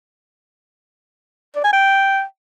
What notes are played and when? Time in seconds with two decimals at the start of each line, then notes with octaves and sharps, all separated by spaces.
1.55 D5
1.64 G#5
1.73 G5